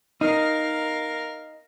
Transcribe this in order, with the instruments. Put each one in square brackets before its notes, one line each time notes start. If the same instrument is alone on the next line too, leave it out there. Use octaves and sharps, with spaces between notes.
[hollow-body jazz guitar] D#4 [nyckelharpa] A#4 F5